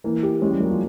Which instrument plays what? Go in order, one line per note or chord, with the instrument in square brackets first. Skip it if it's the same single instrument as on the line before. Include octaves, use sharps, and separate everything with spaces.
[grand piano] E3 [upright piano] A#3
[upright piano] G4
[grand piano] G#3 [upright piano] C#4
[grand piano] G3
[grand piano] F#3 [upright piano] A#3
[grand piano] F3